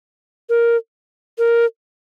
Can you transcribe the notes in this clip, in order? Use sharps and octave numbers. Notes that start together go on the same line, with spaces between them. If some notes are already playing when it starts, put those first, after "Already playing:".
A#4
A#4